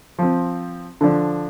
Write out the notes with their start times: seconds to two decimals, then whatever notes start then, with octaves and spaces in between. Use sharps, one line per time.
0.19 F3 C4
1.01 D3 F3 D4